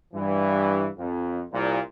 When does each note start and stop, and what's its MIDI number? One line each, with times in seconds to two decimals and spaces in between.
0.14 0.87 43
0.14 0.87 52
0.98 1.42 41
1.52 1.78 36
1.52 1.78 46